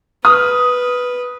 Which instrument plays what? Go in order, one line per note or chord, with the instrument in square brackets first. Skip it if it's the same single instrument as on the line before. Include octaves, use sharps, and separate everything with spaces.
[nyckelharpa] B4 [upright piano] D#6 F6